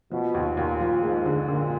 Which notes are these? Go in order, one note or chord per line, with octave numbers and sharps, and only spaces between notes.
B2 F3
D#2
D#2 A#2
F3
G#2 G#3
D3
A#2 D3